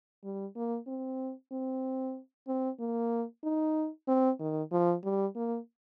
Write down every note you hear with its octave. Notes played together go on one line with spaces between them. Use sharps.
G3
A#3
C4
C4
C4
A#3
D#4
C4
D#3
F3
G3
A#3